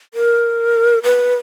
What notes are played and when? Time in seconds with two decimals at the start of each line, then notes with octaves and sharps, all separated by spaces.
0.14 A#4
1.03 B4